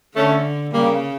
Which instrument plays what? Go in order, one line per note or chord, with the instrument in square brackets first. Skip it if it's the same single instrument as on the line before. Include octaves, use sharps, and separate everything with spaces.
[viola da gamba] D3 [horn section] A3 C#4
[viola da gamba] C#3 [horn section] G3 A#3